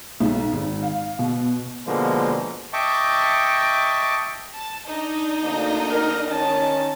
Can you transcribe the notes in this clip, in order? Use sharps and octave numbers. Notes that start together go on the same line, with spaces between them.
B1
G#1
F5
B2
B2 D3 F3 G#3 A#3
D#5 E5 G5 A5 C#6 D6
A5
D4 D#4 D#5
D2 D3 A#3
A#4
D#3 C#4 A5